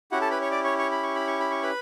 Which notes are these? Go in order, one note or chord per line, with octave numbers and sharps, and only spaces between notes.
C#4 E4 F#4 G4 F#5
A4 A5
B4 B5
C#5 C#6
D5 D6
C#5 C#6
C#5 C#6
B5
C#6
B5
C#6
B5
C#6
B4 B5